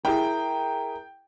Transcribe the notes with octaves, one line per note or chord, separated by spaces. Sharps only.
E4 G#4 A#4 G5